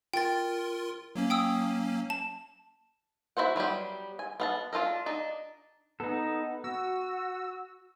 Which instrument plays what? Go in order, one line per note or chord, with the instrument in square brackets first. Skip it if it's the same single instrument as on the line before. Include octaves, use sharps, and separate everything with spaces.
[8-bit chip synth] F4 A#4 C6 [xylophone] G5 A6
[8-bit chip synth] F#3 A#3 C#4
[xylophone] G5 D#6 E6
A5
[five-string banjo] E4 F#4 C5 F#5
F#3 G3 B3 G4
G#5
B3 F5 A5
D4 F4 A4 A#4
D4 D#4
[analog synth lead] B3 [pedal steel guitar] D#4 A4
[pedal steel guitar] F#4 [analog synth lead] E6